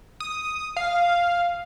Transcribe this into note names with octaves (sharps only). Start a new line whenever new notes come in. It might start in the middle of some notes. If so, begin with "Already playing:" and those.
D#6
F5